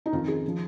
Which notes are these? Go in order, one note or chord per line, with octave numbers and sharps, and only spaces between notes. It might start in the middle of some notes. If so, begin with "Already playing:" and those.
D#4
F2 D#3 F4
G#4
F3